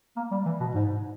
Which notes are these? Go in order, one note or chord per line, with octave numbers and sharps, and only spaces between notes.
A#3
G3
E3
B2
G#2